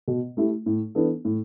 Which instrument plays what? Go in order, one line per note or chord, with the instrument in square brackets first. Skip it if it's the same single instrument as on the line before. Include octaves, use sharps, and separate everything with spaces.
[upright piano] B2
A3 E4 G4
A2
E3 B3 D4 A4
A2